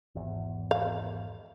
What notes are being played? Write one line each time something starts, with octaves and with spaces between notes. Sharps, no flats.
G#1 E2
F5